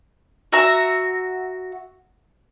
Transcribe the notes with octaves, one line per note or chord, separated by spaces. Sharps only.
F#4 E5 A#5